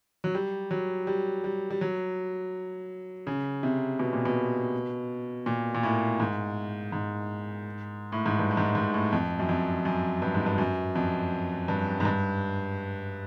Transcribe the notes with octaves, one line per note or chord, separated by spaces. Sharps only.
F#3
G3
F#3
G3
G3
G3
F#3
C#3
C3
B2
A#2
B2
A#2
A#2
A2
G#2
G#2
A2
G#2
G2
A2
G#2
G#2
A2
F2
F#2
F2
F#2
G2
G#2
G2
F#2
F2
G2
G#2
G2